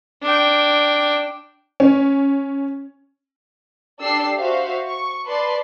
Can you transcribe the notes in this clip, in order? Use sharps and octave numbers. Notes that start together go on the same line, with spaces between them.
D4 G5
C#4
D4 G4 A4 E6 C7
F#4 C5 E5 F5
C#6
B4 D5 A5 C6